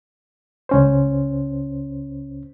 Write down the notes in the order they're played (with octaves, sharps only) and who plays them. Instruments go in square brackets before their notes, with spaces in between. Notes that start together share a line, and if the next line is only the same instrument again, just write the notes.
[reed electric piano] C#2 C#4 C5